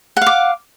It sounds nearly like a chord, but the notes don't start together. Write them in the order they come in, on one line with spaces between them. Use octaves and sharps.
F#5 F5 D6